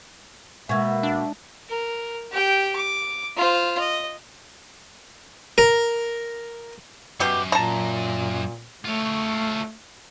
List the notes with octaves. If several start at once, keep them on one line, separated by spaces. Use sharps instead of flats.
B2 G#3 A#3 E5 C#6 G#6
D4
A#4
G4 G5
D6
F4 C5
D#5
A#4
F#2 B2 G4
A#2 A5 A#5
A3 F4 C#5